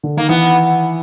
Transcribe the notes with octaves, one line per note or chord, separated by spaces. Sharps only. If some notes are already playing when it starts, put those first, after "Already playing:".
D3
D#3 A#3
E3 B3